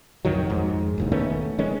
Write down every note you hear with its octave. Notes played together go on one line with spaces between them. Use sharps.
A1 F2 D#3 F#3
F2 G#2
E1 A#1 D#2
D#3 A3 B3 C#4
D#3 G#3 C#4